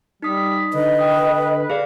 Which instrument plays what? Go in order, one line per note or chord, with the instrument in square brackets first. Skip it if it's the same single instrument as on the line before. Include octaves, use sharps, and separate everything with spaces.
[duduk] G3 [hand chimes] D#4 D#6 [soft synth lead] B6
[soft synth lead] D3 [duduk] B4 [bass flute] D#5
[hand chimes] G5 D#6
[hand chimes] G#4 D5 [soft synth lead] F5